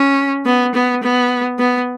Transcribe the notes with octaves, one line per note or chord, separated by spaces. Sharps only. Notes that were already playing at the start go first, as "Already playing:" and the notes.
Already playing: C#4
B3
B3
B3
B3